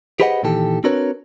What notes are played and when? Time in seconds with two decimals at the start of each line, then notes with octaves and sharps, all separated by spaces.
0.20 G4 G#4 B4 C5 D#5 F#5
0.43 A#2 D#3 E3 G4 A4
0.84 C4 D4 F#4 A#4 B4 C#5